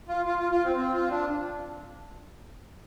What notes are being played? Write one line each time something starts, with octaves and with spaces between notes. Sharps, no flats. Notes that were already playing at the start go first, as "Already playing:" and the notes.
F4
F4
F4
F4
C4
C4
F4
D4